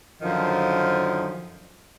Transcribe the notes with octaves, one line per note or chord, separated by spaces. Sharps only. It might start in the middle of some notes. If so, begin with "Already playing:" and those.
F#2 D3 D#3 F3